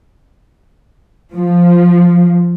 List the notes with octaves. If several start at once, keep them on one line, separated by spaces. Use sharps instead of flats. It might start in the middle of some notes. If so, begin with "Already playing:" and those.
F3